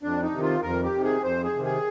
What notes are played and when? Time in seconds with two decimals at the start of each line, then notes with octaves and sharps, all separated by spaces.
0.03 F2 D4
0.23 D#4
0.32 C3 D#3
0.42 F4
0.63 F2 A#4
0.84 G4
0.93 C3 D#3
1.04 G#4
1.23 F2 C5
1.44 G#4
1.54 C3 D#3
1.64 G#4